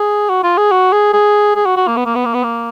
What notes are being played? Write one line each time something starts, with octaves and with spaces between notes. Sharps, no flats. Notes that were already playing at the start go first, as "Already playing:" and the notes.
Already playing: G#4
F#4
F4
G#4
F#4
G#4
G#4
G#4
F#4
F#4
A#3
B3
A#3
B3
A#3
B3
A#3